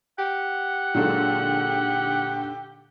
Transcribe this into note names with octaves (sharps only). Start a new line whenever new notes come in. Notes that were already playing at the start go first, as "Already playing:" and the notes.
G4 F#5
A#2 D3 F#3 G#3 D#4 A4